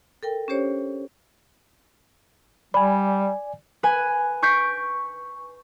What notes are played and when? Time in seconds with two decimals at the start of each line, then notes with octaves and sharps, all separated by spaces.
0.23 A4 A#4 G5
0.48 C#4 D4 G4 C5 C#5
2.74 G3 D5 G#5 B5
3.83 B4 G#5
4.42 C#6 G6 B6 C7 D7